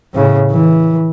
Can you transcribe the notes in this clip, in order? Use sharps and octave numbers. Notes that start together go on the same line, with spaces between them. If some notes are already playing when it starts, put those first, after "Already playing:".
A2 C#3
E3